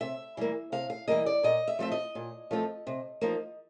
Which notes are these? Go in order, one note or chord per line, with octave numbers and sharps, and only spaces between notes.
C3 E5
E3 G3 A#3
C3 F5
F5
E3 G3 A#3 D#5
D5
A#2 D#5
E5
F3 A3 C4 F4 E5
D#5
A#2
F3 A3 C4 F4
C3
F3 A#3 D#4